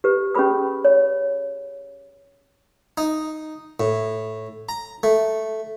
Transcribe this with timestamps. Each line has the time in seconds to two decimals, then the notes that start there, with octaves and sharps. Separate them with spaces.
0.04 G4 B4
0.35 C#4 G4 G#4 B4 B5 D#6
0.85 C#5
2.98 D#4
3.80 A2
4.69 A#5
5.03 A3